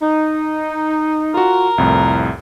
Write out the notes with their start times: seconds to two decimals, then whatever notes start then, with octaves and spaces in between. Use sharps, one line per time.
0.01 D#4
1.34 F4 F#4 A#4
1.78 C2 F2 A2